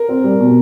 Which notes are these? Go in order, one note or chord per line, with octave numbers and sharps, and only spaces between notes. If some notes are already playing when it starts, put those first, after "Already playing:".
Already playing: A#4
C4
G3
B2